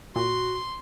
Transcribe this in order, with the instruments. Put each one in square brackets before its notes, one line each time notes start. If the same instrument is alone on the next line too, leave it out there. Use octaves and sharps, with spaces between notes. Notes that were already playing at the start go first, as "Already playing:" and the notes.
[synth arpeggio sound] A#2 [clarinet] F#4 [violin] C6